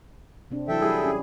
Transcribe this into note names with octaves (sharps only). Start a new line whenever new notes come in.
C3 C4 D4
E3 F#3 E4 A4 E5 G5
G3 E4 G#4
C#4 G4